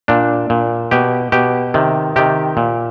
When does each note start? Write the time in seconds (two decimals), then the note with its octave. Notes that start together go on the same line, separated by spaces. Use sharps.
0.08 A#2 D4
0.50 A#2
0.91 B2 G4
1.32 B2 G4
1.74 C3 D#3
2.16 C3 D#3 G4
2.57 A#2